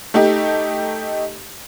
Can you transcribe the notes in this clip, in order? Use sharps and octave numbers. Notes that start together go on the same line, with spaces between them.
A3 D#4 G4